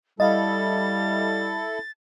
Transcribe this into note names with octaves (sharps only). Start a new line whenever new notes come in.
G3 E4 A4 D#5 F5 A6